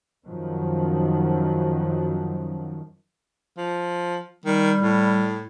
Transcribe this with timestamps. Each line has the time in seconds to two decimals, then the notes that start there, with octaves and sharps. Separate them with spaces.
0.26 F#2 D#3 F3 F#3
3.57 F3
4.46 D#3 G3
4.81 A2